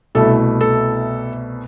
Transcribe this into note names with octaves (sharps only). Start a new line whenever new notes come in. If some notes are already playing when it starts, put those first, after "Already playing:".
C2 B2 A3 E4 A4
A4